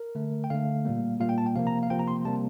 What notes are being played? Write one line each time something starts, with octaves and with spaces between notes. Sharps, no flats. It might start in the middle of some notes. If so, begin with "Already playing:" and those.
Already playing: A#4
D3 A3
G5
D3 A3 F5
A#2 G3 A#3
A#2 G3 A#3 F5
G5
A5
G5
C3 F3 A#3 F5
A#5
F5
C3 F3 A#3 G5
A#5
C6
C3 G3 A#3 A5